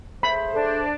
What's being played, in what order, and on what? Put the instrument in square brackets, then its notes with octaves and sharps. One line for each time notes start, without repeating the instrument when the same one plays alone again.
[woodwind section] A3 G#4 C5 [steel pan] B5
[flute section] D4 [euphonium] A4